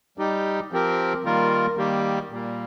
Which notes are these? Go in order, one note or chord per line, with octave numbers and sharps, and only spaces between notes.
G3 D#4 G4
F3 C4 G4 A#4
D#3 G3 A#3 F4 A#4
D#3 G3 A#3 G4
A#2 G3 A#3